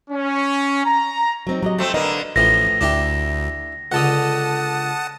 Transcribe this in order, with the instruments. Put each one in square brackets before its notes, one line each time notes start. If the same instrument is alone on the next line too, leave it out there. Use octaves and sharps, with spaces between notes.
[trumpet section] C#4
A#5
[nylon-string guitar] F#3 C4 D#4
F#3 G4 D#5
[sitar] A3 C4
[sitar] D3 A#3 [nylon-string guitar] B4 D#5
[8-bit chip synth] A1 [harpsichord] A2 E3 F3 [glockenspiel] A#6
[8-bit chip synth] D2 [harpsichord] D4 E4 G4
[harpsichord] C#2 D3 [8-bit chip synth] F#5 A5 D#6